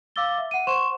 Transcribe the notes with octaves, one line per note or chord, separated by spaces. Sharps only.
F5 D6 E6 A6 G7
E5
F#5 D#7
C5 F#5 C6 C#6 E7